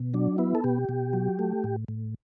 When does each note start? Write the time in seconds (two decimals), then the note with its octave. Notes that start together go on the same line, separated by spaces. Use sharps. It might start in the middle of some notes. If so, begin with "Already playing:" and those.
Already playing: B2
0.14 F#3 D4
0.38 B3 E4
0.55 A4
0.64 B2 G4
0.89 B2
1.13 F#3
1.39 A3
1.64 A2
1.88 A2